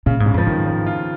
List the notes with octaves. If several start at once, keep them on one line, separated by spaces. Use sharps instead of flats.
A#2 C#3
G#2
C#3
F2 F3
G#2 D#3
F3
F4